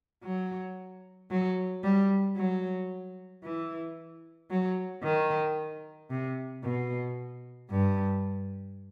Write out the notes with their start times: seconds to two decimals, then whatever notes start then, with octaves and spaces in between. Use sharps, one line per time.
0.24 F#3
1.31 F#3
1.83 G3
2.37 F#3
3.44 E3
4.51 F#3
5.03 D#3
6.10 C3
6.63 B2
7.70 G2